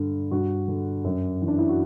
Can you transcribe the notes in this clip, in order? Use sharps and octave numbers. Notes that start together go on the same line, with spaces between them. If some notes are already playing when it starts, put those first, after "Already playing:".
Already playing: G2 D3
G2 F#4
D3
F#2
E3
D4
E4
F#4